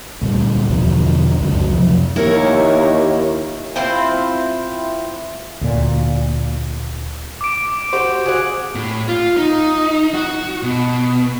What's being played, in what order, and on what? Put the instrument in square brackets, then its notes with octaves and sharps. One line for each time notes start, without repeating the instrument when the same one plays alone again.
[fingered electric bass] D2 A#2 G3
E2 B2 D3 F3
C#2 F#2 F#3
F2 C3 F3
[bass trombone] D#2 [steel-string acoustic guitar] E4 A#4 C#5
[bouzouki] C4 E4 F4 C5
[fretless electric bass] D2 A#2
[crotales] D6 D7
[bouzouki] F#4 G4 C5
G#4 F#5
[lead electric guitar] A2
F4
D#4
F#4
B2